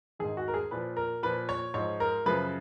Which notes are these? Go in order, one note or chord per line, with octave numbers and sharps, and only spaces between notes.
G#2 D#3 G#4
F#4
A#4
G#4
A#2 F3 B4
A#4
A#2 F3 B4
C#5
G#2 F3 C#5
A#4
F#2 C#3 F3 B4